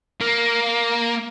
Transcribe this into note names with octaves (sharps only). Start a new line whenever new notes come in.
A#3